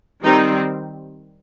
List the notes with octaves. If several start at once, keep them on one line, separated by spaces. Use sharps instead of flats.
D#3 G3 C4 D#4